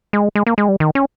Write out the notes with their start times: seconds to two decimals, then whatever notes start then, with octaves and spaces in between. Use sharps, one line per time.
0.13 G#3
0.35 G#3
0.47 A#3
0.58 G#3
0.68 G3
0.80 D#3
0.95 C#4